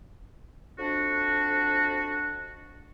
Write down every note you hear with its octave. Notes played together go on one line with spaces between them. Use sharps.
F2 D4 F#4